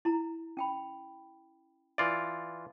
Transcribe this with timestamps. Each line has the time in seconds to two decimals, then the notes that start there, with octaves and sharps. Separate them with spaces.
0.05 E4 A#5
0.57 C#4 G5 B5
1.98 E3 F4 D5 E5